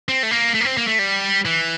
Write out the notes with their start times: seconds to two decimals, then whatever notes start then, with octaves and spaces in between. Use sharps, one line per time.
0.09 C4
0.23 A3
0.31 A#3
0.55 A3
0.61 A#3
0.65 C4
0.77 A#3
0.88 A3
0.99 G3
1.45 E3